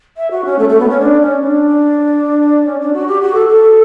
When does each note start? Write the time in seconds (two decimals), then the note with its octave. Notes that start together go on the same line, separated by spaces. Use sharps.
0.17 E5
0.31 F#4
0.45 C#4
0.59 A3
0.69 A3
0.80 B3
0.90 C#4
1.00 D4
1.21 C#4
1.42 D4
2.66 C#4
2.80 D4
2.94 F#4
3.07 G4
3.21 F#4
3.34 A4
3.49 A4